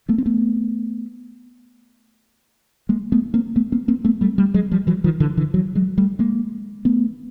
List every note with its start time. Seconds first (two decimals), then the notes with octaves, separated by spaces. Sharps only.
0.09 A3 B3
0.18 C4
0.26 A3 B3
2.89 G#3 A#3
3.12 A3 B3
3.34 A#3 C4
3.56 A3 B3
3.72 A#3 C4
3.88 A#3 C4
4.05 A3 B3
4.21 G3 A3
4.38 G3 A3
4.54 F#3 G#3
4.71 F3 G3
4.87 E3 F#3
5.04 D#3 F3
5.20 D3 E3
5.37 D3 E3
5.54 E3 F#3
5.75 F#3 G#3
5.98 G3 A3
6.19 G#3 A#3
6.85 A3 B3